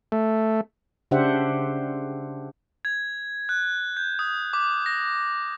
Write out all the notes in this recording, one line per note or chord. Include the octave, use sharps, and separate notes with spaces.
A3
C#3 D4 G4 C5 E5 F#5
G#6
F#6
G6
D#6
D6
A#6